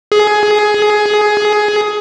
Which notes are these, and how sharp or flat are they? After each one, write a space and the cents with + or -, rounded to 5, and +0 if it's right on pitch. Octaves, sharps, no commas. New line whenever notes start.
G#4 +15